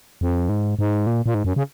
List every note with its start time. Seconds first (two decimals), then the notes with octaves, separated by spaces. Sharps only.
0.21 F2
0.49 G#2
0.79 G#2
1.07 A#2
1.26 A#2
1.34 G#2
1.45 F#2
1.56 C#3